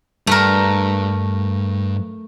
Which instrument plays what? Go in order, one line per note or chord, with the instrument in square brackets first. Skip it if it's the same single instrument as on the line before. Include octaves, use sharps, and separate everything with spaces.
[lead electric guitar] G2 [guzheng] A3 A#4